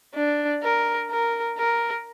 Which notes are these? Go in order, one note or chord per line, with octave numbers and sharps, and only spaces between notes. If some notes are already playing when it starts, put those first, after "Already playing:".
D4
A#4
A#4
A#4